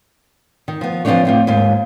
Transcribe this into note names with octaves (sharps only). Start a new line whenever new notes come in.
D#3
F3 B3
E3 F3 G3 C4 D4 C#5
A2 C4 F4
D#2 G#2 F4